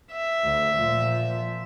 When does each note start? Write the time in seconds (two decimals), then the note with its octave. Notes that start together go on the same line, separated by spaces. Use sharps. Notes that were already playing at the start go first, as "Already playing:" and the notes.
0.12 E5
0.44 D2
0.76 A#2 F3